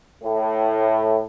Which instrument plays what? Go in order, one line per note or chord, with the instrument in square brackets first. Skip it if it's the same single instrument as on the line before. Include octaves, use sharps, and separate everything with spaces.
[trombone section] A2